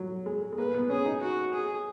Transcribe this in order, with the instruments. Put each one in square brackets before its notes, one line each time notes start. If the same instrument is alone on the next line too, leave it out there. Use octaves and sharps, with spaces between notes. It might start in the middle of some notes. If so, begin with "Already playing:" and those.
Already playing: [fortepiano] F#3
G#3
G#3
[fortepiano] A#3 [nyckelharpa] B4
[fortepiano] B3
[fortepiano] C#4 [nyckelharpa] G#4
[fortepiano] D#4
[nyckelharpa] F#4
G#4